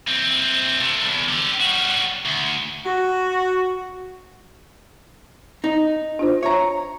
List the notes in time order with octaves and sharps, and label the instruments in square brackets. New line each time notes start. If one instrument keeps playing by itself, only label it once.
[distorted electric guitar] E3 C4
C3 A3
E2
D3 G4
G3 F#4
D2
[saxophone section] F#4
[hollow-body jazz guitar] D#4
[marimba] D4 F4 C5
[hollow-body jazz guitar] C#5 A#5 [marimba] E5